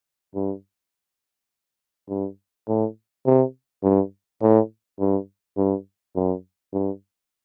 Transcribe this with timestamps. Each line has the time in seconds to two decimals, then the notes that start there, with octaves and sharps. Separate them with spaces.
0.35 G2
2.09 G2
2.68 A2
3.26 C3
3.83 G2
4.42 A2
4.99 G2
5.57 G2
6.16 F#2
6.73 G2